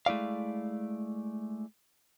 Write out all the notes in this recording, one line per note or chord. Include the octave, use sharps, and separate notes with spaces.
G#3 A3 E4 D5 F5